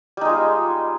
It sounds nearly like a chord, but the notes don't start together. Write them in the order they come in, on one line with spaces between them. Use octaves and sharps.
G3 D#4 G#3 F4